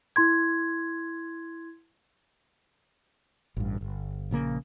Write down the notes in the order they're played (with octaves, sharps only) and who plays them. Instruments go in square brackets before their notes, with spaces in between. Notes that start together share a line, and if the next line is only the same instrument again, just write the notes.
[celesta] E4 C6 G#6
[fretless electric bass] A1 G2
G1
A#1 C#3 A#3